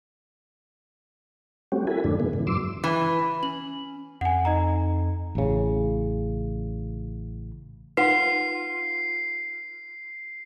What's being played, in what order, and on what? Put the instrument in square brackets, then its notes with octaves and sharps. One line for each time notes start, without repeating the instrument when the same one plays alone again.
[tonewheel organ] G3 A3 C4 C#4 F#4 G4
E4 F#4 A4 A#4 G#5 B5
F2 G#2 D3 A3 D4
B2 D#3 G#3 A#3 B3
G#2 C#3 E3
F#2 F#3 C6 D6 E6
[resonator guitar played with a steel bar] E3
[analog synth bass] C#4 [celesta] F#7
[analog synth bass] F2 [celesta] F#5 G#5
[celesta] D#4 D#5 A#5
[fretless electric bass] A1 C#3
[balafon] D#4 [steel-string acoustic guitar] F4 [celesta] B4 F#5 [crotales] C7